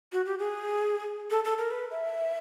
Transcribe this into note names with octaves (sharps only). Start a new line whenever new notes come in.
F#4
G4
G#4
A4
A4
A#4
B4
E5